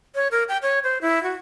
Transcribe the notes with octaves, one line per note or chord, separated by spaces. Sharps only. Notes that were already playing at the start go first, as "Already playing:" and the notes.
C#5
A#4
G5
C#5
C5
E4
F#4